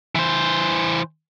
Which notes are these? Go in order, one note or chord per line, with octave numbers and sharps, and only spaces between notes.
E3 C5